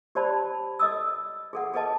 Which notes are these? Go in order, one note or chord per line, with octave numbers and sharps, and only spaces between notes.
G4 C5 D5 A5 B5
A4 D#5 D#6 E6
G#4 A4 F#5
G#4 A4 B4 D#5 A5